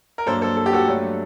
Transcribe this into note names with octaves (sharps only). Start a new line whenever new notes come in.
A#4
G2 F#3 A#3 A4 C5
A4 C5
A4
G4
F#4 A4
G2 F#3 A3